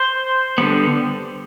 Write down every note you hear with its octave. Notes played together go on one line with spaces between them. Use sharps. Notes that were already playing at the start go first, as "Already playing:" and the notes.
Already playing: C5
D3 G3 B3